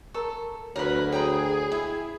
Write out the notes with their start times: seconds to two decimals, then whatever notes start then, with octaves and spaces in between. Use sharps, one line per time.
0.14 A4 A#4 A#5 C#6
0.76 D2 F#3 A#4 B4 C#5 B5
1.12 G#4 C#5 G5 A#5 B5
1.72 E4